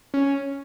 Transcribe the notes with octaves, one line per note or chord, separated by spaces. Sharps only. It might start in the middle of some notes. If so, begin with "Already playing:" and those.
C#4